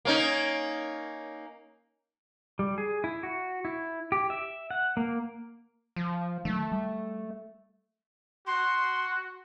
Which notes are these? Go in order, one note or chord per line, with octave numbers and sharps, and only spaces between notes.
A#3 C#4 D#4
G3
G#4
E4
F#4
E4
G4
E5
F#5
A#3
F3
D#3 F#3 A3
G3
F#4 C6